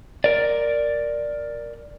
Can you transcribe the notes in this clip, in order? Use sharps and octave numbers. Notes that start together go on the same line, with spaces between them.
A#4 D5